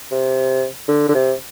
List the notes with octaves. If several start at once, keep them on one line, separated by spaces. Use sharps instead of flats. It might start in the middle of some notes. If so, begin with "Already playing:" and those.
C3
D3
D3
C3